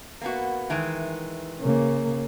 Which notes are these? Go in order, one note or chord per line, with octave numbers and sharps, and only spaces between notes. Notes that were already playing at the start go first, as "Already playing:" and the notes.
A#3 B3 F#4
D#3 E3 G#3
C#3 A#3